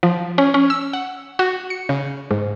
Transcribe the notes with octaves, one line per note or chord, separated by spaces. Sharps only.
F3
C#4
C#4
E6
F#5
F#4
C#7
C#3
G#2